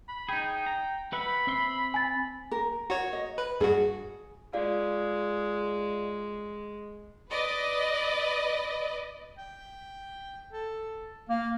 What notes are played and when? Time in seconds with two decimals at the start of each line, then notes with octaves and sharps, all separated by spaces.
0.08 B5
0.29 D#4 G#4 G5
0.66 A#5
1.13 B4 E5 F#5 B5
1.47 C4 E5 C6
1.94 G#5 A6
2.51 A#4
2.90 F#4 C#5
3.13 D#5
3.38 B4
3.60 G2 F#4 G#4
4.53 G#3 F4 D5 F5
7.30 B4 D5 D#5
9.38 G5
10.52 A4
11.29 A#3 F5